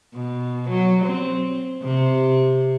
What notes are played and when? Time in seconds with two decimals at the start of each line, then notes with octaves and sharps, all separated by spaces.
0.15 B2
0.70 F#3
1.05 C4
1.83 C3